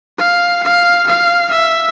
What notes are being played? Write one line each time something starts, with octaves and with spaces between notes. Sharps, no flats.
F5
F5
F5
E5